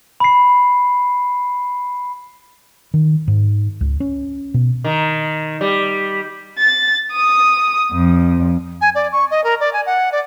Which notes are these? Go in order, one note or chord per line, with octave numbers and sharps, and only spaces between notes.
B5 C7
D#3
G#2
C#2
C#4
B2
D#3
G3
A6
D#6
F2
G#5
D5
C#6
D#5
A#4
D5
G#5
F#5
D5